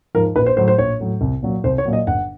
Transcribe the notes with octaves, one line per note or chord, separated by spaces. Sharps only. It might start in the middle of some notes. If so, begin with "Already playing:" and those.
G#2 F3 A#4
A#1 B4
C5
A2 F#3 C5
C5
A#1 C#5
A2 F#3
C2
A#2 F#3
C2 C5
C#5
A#2 F#3
D#5
G1 F#5